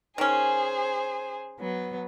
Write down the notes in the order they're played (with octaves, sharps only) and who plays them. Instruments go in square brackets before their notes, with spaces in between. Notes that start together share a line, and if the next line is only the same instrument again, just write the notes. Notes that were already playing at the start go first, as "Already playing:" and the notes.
[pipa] D#3 C#4 [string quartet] G#4 C5
[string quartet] F#3 B3